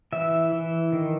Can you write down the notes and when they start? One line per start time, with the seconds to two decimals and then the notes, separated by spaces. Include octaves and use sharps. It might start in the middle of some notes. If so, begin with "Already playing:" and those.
0.12 E3 E5
0.52 E3
0.93 D#3